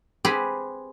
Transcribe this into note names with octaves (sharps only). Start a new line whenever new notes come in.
C4 G4 G#4 B4